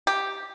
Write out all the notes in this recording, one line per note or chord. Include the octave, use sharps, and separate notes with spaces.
G4